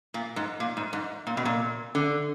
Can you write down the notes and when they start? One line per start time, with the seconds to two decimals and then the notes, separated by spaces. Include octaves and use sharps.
0.14 A#2
0.36 G#2
0.60 A#2
0.77 G#2
0.93 G#2
1.27 A#2
1.37 B2
1.45 A#2
1.95 D3